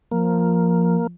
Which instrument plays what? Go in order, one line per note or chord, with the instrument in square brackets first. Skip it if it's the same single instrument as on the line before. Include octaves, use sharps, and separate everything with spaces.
[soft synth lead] F3 [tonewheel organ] A#3